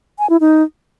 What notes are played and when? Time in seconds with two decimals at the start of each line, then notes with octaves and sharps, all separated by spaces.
0.19 G#5
0.30 E4
0.41 D#4